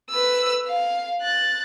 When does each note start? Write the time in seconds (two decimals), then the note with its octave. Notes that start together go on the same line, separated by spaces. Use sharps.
0.11 B4 E6
0.66 F5
1.21 F#6 A6